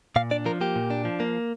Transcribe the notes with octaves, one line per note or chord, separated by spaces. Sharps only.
A#2 F5
D4 D5
F3 A#4
A#3 G4
A#2
D4
F3
A#3